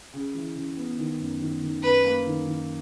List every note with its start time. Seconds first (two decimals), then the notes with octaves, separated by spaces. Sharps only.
0.14 C#3
0.35 E3
0.56 C#3
0.77 B3
0.98 D#3
1.20 F#2
1.41 D#3
1.62 D#3
1.83 F#2 B4
2.05 A#3
2.27 D#3
2.47 D#3